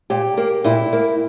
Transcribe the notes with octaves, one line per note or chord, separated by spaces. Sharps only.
A#2 G4
A#3
A#2 E4
A#3